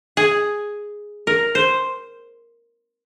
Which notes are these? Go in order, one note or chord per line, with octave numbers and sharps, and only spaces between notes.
G#4
A#4
C5